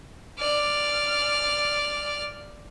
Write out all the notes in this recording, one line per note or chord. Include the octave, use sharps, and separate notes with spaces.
D5 F6